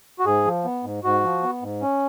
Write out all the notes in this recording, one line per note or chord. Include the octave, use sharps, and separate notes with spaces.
F#4
G#2 G#4
F3
B3
G#2
G#2 F#4
F3
B3
G#2
C#4